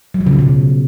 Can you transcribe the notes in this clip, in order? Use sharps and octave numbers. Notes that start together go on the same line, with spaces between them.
F#3
F3
C#3
F#3
B2